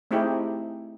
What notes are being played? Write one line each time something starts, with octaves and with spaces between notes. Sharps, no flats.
A3 C4 D#4 E4 G4 G#4